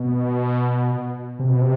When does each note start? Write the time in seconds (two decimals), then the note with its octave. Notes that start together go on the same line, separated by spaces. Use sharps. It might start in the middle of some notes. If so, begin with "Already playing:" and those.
Already playing: B2
1.39 C3
1.50 B2
1.61 C3